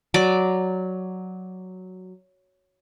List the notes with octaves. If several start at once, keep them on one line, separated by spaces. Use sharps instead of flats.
F#3 D5 D6